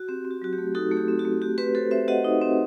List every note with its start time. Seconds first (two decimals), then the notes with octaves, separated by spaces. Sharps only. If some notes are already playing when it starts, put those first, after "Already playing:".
Already playing: F#4
0.08 C4 G4
0.25 C4
0.31 F#4
0.42 F#3 F#4
0.53 G4
0.58 A3
0.75 D#4 F#4 A4
0.91 A3
0.97 G4
1.08 C4
1.19 F#4
1.25 A3
1.42 F#4 G4
1.58 C4 G4 B4
1.75 F#4 A4 C5
1.91 C4 C5 E5
2.08 F#4 D#5 F#5
2.24 D#4
2.41 C4